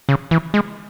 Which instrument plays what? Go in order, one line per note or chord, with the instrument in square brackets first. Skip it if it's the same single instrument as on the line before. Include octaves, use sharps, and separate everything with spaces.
[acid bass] C#3
E3
G#3